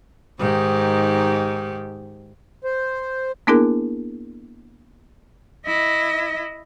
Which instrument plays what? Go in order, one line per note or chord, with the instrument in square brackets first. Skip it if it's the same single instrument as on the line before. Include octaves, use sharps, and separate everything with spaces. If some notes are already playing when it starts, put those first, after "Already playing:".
[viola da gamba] G#2 D#3 G4
[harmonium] C5
[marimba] A#3 B3 D4 E4 G#4 A#4
[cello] E4 D#5